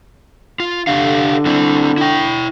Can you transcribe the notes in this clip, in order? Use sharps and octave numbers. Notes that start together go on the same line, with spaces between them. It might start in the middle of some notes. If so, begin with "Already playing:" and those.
F4
D3 G4 A4 F5
C4 E4
E4 G5